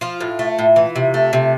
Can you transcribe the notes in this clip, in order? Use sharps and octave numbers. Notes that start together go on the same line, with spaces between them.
F3 F4
A2
A3
A2
E3
C3
A3
C3